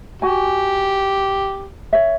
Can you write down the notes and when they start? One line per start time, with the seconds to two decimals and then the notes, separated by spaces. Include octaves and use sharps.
0.22 F#4 G4 G#5
1.93 C#5 E5